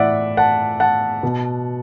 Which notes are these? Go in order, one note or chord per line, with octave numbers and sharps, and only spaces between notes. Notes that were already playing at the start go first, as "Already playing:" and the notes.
Already playing: A2 E3 D5 E5 F#5
F#5 A5
F#5 A5
B2